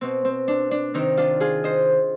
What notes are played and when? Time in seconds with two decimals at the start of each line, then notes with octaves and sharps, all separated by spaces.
0.01 B2 C4
0.25 C4
0.48 D4
0.71 D4
0.94 C3 D#3 C4 D#4
1.17 D4 F4
1.40 F4 G#4
1.64 C5 D#5